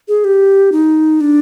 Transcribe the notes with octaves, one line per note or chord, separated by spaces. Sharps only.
G#4
G4
D#4
D4